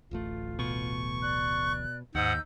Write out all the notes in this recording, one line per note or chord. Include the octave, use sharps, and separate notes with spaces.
D1 A1 A3 F4
B2 C#6
D5 F#6
D#2 G#2 D#4 F#5 E6 G6